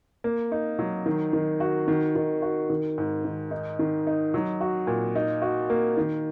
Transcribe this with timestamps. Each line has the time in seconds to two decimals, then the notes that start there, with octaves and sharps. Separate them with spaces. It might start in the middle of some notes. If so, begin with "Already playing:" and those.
0.24 A#3
0.52 D#4
0.79 F#3
1.06 D#3
1.33 D#3
1.60 F#4
1.88 D#3
2.16 D#3
2.42 F#4
2.70 D#3
2.98 G#2
3.25 D#3
3.51 D#4
3.79 D#3
4.07 D#4
4.34 F#3
4.61 F#4
4.87 A#2
5.15 D#4
5.42 F#4
5.70 A#3
5.97 D#3